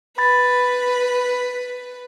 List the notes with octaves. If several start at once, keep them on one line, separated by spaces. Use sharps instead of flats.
B4 B5 A6